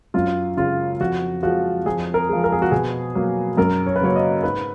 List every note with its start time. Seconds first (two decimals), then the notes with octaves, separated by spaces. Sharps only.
0.14 F#2 F4
0.57 C#3 G#3 F4
1.00 F2 F#4
1.43 F3 G#3 F#4
1.86 F2 G#4
2.14 A#4
2.29 F3 G#3
2.44 A#4
2.52 G#4
2.62 F#4
2.71 B2 G#4
3.15 F#3 A#3
3.57 F#2 A#4
3.86 C#5
3.96 B4
4.01 C#3 F#3 A#3 C#5
4.16 D#5
4.43 G#2 B4